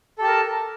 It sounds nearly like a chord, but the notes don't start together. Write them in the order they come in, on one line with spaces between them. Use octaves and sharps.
A4 G4 A5 A#4